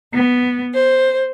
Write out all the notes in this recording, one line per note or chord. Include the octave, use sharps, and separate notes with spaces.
B3
C5